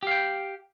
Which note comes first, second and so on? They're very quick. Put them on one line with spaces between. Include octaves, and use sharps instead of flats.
G4 F5 G5